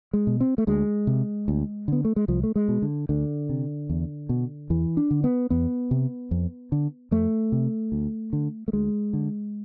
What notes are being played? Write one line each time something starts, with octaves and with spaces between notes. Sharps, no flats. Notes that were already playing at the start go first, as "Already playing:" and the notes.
G#3
B2
C4
A3
D2 G#3
C3
D2
D3 B3
A3
G#3
C2 F3
A3
G#3
B2
D3
D2 D3
C3
E2
B2
E2 E3
D4
D3
B3
E2 B3
C3
F2
D3
F2 A3
C3
D2
D3
A3
D2 G#3
D3